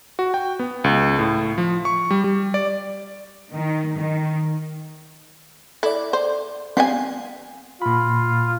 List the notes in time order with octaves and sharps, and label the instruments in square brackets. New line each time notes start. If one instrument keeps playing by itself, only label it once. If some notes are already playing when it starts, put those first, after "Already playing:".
[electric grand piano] F#4
G5
B3
C#2
A2
F3
C#6
G3
G3
D5
[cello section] D#3
D#3
[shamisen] E4 [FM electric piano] A4 D5
[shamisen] C5
[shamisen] F3 G3 G#5 [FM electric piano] B3 C4 G5
[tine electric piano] A#2 B5 [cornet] F4